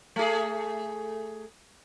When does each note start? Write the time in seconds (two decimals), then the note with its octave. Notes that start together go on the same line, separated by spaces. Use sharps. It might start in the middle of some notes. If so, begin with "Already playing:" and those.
0.16 A3 G#4